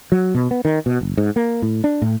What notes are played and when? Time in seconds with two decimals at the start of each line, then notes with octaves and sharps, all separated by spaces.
0.12 F#3
0.35 B2
0.51 B3
0.65 D#3
0.86 B2
1.01 F#1
1.17 G#2
1.36 A#3
1.62 A2
1.84 D4
2.02 A2